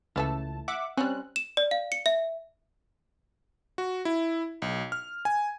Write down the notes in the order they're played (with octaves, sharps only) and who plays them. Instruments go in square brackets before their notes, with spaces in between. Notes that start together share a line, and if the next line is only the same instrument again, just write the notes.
[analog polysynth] C#2 A5 [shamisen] E3 A3 A4
[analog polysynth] E5 F#5 D6
[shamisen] G3 C#4 [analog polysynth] C4 F#6
[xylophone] E7
D5
F5
C#7
E5
[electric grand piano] F#4
E4
B1
F6
G#5